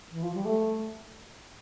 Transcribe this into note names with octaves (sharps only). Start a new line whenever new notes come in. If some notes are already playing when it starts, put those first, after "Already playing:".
E3
F3
G3
A3